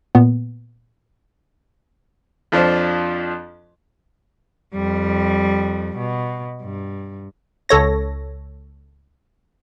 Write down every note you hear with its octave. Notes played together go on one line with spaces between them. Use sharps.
A#2 B3
F2 F3 D4 F4 C5
F2 G3
B2
G2
C#2 A4 C#5 A#6